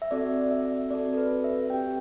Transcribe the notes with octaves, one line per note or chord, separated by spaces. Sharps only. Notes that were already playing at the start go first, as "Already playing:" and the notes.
E5
C4 F#4 A4 D5
E5
C4 F#4 A4 D5
A4
B4
E5
C4 G4 G5